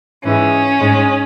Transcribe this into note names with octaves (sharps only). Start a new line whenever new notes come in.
G#2 E3 G#3 C#4
G#2 G#3